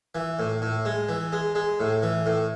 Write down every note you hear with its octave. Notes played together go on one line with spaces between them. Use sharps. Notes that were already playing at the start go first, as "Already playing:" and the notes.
E3
A2
A2
G#3
E3
G#3
G#3
A2
E3
A2